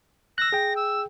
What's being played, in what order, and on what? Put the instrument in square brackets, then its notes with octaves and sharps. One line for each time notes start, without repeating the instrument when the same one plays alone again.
[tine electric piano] E6 F#6 [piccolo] A#6
[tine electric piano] G#4 G5
[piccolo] E6